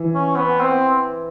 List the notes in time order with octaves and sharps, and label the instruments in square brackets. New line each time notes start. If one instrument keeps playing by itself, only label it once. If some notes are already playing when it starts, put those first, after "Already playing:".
Already playing: [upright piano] E3
[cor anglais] C#4
B3
C4